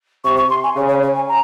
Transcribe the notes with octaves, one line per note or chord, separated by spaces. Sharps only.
C3 C#6
C#6
C6
G#5
C#3 C#5
C#5
C#5
G#5
A#5